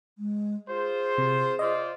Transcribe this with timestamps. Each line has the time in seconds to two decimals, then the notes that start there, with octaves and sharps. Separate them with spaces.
0.18 G#3
0.68 F4 G#4 C5
1.18 C3
1.59 F4 C5 D5 D#5